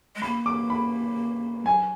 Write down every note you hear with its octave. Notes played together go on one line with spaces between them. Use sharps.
G#3
A#3 B5
D6
B5
F#3 G#5